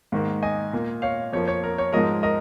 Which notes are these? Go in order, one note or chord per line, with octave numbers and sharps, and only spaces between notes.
G#2 D#3 A#3
D#5 G#5
A#2 A#3
C#5 F5
F2 F3 A#3 C#5
C#5
A#4
C#5
G#2 F3 G#3 A#4 D#5
A#4 D#5